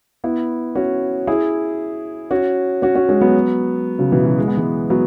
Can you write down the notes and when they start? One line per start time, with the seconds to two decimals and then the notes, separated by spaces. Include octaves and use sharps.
0.24 B3 E4
0.75 C#4 F#4
1.27 E4 G#4
2.31 C#4 F#4
2.82 C#4 F#4
2.95 C#4 F#4
3.09 G#3 C#4
3.21 F#3 B3
3.99 C#3 F#3
4.12 B2 E3
4.25 C#3 F#3
4.38 G#3
4.48 B3
4.57 E3 G#3
4.90 F#3 B3